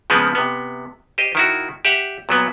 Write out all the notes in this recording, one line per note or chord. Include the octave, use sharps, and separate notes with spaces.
C#3 F3 G#3 B3 C4
C3 B3
G4 C5 D#5
D#3 E4 F#4
G4 E5 F#5
A#2 F#3 B3